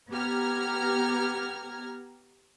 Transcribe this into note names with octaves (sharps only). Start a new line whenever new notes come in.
B3 G4 A#5 F6 G#6